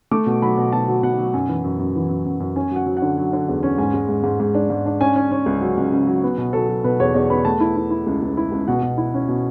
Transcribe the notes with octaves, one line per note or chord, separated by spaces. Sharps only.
A3 D6
B2
F#3 B5
B2
B2 A5
F#3
B2 F#5
F#3
F#2 G#5
E3
F#2
F#2
E3
F#2
F#2
F#2
C#4 G#5
F#3 F#5
F#3
F#5
D3
F#3
D3
E2
C#4
G#2 G#5
G#3
G#2
G#2
G#2
D4
G#2
D4
C#4 G#5
C#4
C#4
C#2
F#3
C#2
C#3
F#3
B3
B2
F#3 A4
F#3
B2 B4
E2 C#5
E2 D5
B3 B5
A3 A5
E4
E4
E4
C#2
C#2
E4
C#2
B2 F#5
B2
E4
C#4
B2